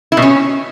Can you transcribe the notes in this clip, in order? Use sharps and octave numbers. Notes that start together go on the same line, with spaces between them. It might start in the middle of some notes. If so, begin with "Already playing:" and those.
E4
B2
C#4